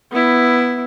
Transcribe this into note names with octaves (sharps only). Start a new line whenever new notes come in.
B3 E4